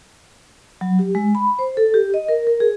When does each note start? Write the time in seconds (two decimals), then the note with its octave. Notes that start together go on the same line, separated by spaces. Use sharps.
0.81 F#3
0.99 G4
1.15 G#3
1.35 B5
1.59 C5
1.77 A4
1.94 G4
2.14 D#5
2.28 A#4
2.47 A#4
2.60 G#4